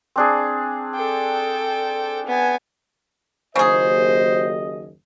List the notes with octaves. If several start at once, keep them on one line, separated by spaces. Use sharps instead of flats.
C4 D4 G#4
A4 G5
B3 G#5
F#1 D#2 C#3 G#4 C5 D#5